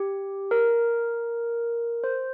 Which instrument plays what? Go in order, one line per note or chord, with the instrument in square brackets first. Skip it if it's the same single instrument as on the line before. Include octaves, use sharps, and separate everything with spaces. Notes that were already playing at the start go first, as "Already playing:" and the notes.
Already playing: [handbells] G4
A#4
C5